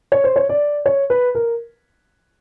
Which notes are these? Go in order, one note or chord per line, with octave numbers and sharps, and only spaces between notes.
C#5
C5
C#5
D5
C#5
B4
A#4